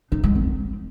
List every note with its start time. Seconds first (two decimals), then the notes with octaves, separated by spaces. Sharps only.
0.12 D#4
0.23 G#3
0.35 C4